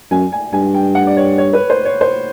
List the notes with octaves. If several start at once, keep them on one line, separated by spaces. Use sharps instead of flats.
F#2 G#5
G#5
G2 G#5
G5
F#5
D5
C#5
C#5
B4
C5
C#5
C5